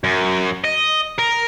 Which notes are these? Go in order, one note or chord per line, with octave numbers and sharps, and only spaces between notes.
F#2
D#5
A#4